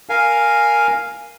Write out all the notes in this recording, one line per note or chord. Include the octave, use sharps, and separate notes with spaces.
A#4 F5 G#5